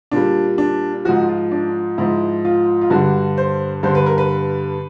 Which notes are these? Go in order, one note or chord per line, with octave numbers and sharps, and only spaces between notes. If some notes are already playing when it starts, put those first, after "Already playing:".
A#2 G3 D4
D4
G#2 F3 F#4
F4
D4
G#2 F3 E4
F4
F4
G2 D3 G3 F#4
C5
G2 D3 G3 C5
B4
A#4
B4